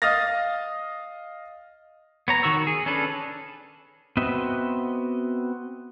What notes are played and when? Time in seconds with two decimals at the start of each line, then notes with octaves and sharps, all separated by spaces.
0.02 D#5 F5 D#6 F6 A6 A#6
2.28 B3 C#5 A#5
2.43 D#3 F#4 C#6 E6
2.67 G#4
2.86 C#4 D4 A4 B4
4.17 B3 C4 F#4 D#5 E5